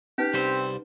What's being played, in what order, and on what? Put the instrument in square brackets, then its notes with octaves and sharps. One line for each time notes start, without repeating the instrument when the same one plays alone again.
[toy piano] C#4 D#4 B4 [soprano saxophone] G4
[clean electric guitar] C2 G3 C5 [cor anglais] C4